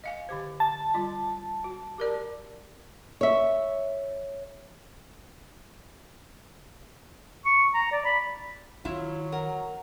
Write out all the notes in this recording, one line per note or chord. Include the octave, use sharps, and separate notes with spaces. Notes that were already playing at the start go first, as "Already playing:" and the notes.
D#5 F5 G#5
D3 G4 C5
A5
G3 F4 D#5
F#4
G4 A#4 D5
C#5 E5
C#6
A#5
D5
B5
D#3 F#3 E4 F4
A#4 F#5